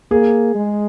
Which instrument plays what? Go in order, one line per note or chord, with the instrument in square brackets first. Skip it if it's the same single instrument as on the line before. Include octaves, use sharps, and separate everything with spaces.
[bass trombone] A#3 [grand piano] G#4
[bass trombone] G#3